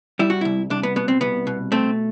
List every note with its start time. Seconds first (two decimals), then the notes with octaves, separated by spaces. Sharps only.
0.19 G3 E4
0.30 F#4
0.41 C2 E4
0.70 C2 D4
0.83 B3
0.96 B2 B3
1.08 C4
1.21 C2 B3
1.47 B2
1.72 A3 C4